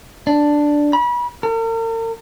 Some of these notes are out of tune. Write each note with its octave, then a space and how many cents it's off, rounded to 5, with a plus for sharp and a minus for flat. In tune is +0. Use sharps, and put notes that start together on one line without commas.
D4 +0
B5 -35
A#4 -45